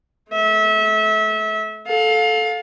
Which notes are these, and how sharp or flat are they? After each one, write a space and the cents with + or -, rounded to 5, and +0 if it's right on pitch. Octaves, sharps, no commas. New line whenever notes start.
A3 -35 E5 -30
A4 -10 F5 +25